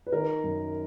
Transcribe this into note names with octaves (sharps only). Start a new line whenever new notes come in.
B4
D#3 A#4
F#2